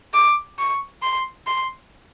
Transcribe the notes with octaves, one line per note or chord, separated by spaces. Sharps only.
D6
C#6
C6
C6